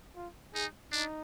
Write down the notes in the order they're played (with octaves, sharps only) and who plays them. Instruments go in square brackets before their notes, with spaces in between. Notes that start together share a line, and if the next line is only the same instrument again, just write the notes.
[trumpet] F4
[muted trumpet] D#4 [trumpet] G#4
[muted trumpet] D4 [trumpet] D#4